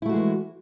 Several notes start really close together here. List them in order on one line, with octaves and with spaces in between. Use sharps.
E4 A3 F#4 G#3 E3